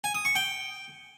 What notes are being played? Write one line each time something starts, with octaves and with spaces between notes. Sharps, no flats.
G#5
D#6
C#6
G5